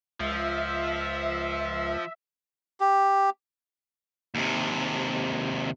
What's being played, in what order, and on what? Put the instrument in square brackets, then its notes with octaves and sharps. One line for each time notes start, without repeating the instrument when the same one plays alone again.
[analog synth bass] C#2 [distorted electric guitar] F3 [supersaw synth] E5
[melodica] G4
[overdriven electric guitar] D#2 C3